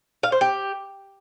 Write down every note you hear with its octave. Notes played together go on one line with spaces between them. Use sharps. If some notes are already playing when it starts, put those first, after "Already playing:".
F5
C5
G4